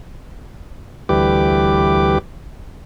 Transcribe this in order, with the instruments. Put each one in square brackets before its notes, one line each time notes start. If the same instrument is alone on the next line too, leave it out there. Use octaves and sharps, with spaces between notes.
[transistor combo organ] D2 E3 G3 G4 B4 D6